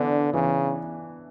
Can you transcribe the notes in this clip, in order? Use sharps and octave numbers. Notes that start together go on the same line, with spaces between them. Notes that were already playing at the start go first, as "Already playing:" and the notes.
Already playing: D3 E3 B3 D4
C#3 E3